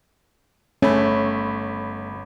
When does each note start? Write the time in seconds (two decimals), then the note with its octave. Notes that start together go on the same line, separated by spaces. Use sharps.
0.82 G1 A3 C#4 B5